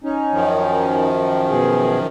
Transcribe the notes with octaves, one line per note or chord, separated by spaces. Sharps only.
C#4 D#4
F#2 D#3 F3
B2 G#4